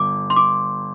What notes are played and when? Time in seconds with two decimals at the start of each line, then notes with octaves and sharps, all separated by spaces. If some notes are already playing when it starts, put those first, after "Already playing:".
Already playing: G1 D6
0.30 C6
0.36 D6